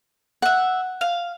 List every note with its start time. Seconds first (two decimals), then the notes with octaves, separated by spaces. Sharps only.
0.42 E5 F#5 F#6
1.01 F5